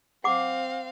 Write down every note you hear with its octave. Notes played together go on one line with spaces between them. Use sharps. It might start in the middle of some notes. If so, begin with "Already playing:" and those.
C4 F5 F#5 D6